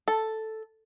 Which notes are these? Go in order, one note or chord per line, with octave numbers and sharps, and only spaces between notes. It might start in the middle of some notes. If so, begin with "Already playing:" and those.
A4